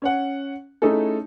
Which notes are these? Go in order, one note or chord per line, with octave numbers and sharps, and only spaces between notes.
C#4 C#5 F#5
A3 C#4 D#4 E4 G#4 A4